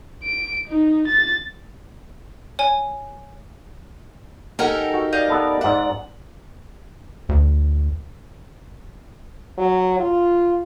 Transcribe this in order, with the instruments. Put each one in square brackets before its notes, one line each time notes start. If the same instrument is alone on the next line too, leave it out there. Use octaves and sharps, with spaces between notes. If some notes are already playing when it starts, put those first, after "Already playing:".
[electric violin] D7
D#4
A6
[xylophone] C#5 G#5
[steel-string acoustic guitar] D#4 G4 A#4 [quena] A4 [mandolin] F#5 G#5 F6
[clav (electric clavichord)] F#4 F#5
[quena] D5 [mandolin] D#5 F5 G6
[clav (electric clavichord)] B3 A4 B4
[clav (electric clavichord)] G#2 E5 [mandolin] F#5
[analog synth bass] D2
[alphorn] F#3
F4